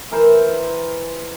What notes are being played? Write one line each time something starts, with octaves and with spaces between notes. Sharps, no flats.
E3 A#4 C5